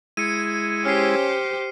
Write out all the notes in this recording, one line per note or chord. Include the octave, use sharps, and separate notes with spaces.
G#3 E4 C#7 D#7
C#4 G4 C5 F6 C7